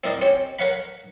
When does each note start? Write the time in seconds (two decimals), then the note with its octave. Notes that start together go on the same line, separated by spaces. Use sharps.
0.04 C4 E4 A#4 D5 D#5
0.21 C4 C#4 G4 C#5
0.59 A#4 B4 C#5 F5 F#5 B5